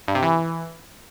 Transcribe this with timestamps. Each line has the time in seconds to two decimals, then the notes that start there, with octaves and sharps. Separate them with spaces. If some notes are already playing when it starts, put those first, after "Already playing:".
0.08 G2
0.15 C3
0.22 E3